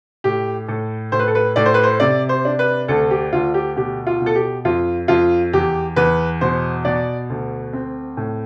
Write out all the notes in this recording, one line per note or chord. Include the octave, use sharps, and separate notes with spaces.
A2 G4
A2 A4
A2 C5
B4
A4
B4
A2 D5
C5
B4
C5
C3 D5
C5
D4
B4
D2 A4
G4
D2 F4
G4
B2 G4
F4
B2
A4
G4
F2 F4
F2 F4
E2 G4
E2 B4
B2 C5
B2 D5
D2
C4
A2